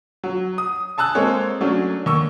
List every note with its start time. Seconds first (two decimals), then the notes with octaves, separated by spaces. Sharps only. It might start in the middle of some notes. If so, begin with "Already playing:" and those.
0.23 F#3
0.58 D#6
0.98 G#5 A5 E6 F#6
1.15 G#3 A#3 C4 A4 C#5
1.61 F#3 A3 C#4 D4
2.06 D#2 C#6 E6